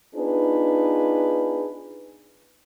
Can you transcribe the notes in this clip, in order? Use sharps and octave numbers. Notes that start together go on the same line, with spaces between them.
B3 D4 D#4 F4 G#4 B4